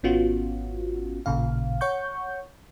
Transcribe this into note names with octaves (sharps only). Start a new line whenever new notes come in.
G#1 B3 C#4 F4 F#4
A1 A#2 C#3 F5
C#5 F#5 C#6 G6